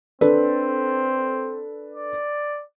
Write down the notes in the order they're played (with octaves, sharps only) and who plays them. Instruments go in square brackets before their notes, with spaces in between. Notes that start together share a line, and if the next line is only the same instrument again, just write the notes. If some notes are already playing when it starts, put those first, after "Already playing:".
[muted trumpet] C4 [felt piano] D4 A4 B4
[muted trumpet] D5